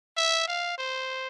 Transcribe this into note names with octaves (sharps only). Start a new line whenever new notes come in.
E5
F5
C5